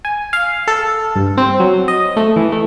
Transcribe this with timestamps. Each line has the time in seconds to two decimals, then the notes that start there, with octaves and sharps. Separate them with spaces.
0.05 G#5
0.33 F5
0.68 A4
1.16 G2
1.37 C4
1.60 F#3
1.88 D#5
2.17 A3
2.36 E3
2.52 A3